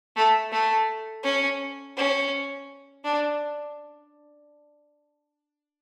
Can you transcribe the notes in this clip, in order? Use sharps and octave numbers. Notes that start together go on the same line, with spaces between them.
A3
A3
C#4
C#4
D4